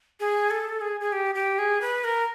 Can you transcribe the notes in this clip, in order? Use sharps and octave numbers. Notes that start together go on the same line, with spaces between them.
G#4
A4
G#4
G#4
G4
G4
G#4
B4
A#4